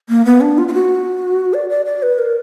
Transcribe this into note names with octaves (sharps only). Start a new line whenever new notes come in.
A#3
B3
D4
F4
F4
F#4
D5
D5
D5
B4
A#4